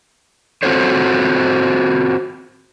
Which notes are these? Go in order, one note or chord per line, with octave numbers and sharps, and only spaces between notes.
C4 F4 F#4 A4 C5 C#5